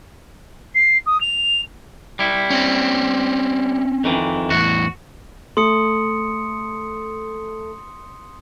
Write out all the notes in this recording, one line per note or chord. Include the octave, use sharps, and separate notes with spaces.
C7
D#6
F7
G3 E4
C4 C#4
F2 D#3 E3
E2 A2 F#4
A3 C6 D#6 C#7